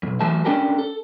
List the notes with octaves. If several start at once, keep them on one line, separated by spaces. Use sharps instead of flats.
B1 F2
E3 F#3 A3 A5
C#4 D4 G4 A4 A#4
A4